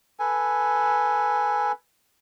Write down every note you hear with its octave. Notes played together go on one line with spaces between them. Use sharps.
A4 B4 G#5